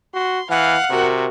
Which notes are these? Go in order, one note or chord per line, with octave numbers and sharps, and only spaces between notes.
F#4 C6
E3 F5 F#5
C3 F#4 A#4